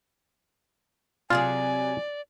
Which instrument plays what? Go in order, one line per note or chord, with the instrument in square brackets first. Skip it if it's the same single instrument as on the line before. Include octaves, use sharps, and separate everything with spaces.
[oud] C3 F#3 G#4 [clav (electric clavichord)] F4 [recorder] D5 [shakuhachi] G#5